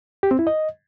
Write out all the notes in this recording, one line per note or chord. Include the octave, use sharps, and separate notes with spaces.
G4
C4
E4
D#5